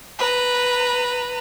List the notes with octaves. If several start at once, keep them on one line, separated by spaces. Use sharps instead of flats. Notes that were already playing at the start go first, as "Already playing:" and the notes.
B4 A#5